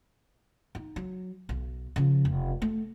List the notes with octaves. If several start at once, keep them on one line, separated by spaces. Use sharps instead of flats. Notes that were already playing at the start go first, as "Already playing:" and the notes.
D#4
F#3
B1
C#3 F3
F1
A3